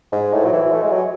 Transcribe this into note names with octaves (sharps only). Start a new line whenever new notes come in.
G#2
A2
F#3
E3
A3
G#3
F#3